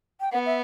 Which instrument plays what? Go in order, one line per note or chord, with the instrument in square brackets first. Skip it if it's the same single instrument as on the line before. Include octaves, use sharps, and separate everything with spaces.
[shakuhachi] G5
[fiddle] B3 [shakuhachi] F#5
[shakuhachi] E5